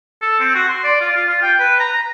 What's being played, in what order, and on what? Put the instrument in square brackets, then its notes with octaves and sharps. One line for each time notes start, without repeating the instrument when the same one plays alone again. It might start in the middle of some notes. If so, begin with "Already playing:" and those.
[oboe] A4
C4
F#4
C6
D5
F4
F4
F4
G5
B4
A#5
A#5